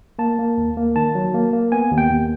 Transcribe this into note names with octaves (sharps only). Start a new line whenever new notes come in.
A#3 A5
A#3
D#2
A#3
D#3 A5
F#3
A#3
A#3
B3 G#5
D#2
G5
D#2